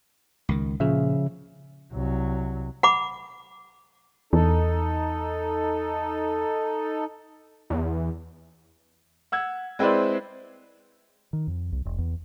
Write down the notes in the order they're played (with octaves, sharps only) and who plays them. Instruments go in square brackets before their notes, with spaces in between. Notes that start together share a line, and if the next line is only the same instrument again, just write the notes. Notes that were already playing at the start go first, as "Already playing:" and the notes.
[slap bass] C#2 D#3
[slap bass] A#2 [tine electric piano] C#3 F3 E5
[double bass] C2 F#3
[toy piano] F#5 B5 D6
[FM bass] E2 [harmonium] D#4 A4
[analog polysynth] E2
[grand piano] F#5 E6 G#6
G#3 C4 E4 B4 C5 D5
[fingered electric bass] D#3
F2
C2
E1
E2